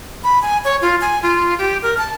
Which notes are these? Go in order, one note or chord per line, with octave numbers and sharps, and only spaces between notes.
B5
G#5
C#5
F4
G#5
F4
G4
A#4
A5